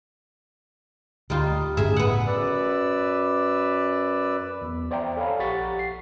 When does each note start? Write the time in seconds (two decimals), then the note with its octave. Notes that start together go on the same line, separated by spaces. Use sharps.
1.30 D2 G3 D#4 F4
1.77 G1 A2 C#3 G#4 E5
1.96 B3 F#5
2.27 F#2 B4 D5 E6
4.61 E2
4.91 C5 D5 E5 G5 A#5
5.17 A4 C#5 F5 G#5 A#5 B5
5.39 A#1 G4 F#5 C#6 A6 B6
5.79 C7